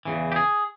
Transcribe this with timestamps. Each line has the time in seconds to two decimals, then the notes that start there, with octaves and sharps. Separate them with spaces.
0.05 E2 C#3 E3
0.32 G4
0.36 G#4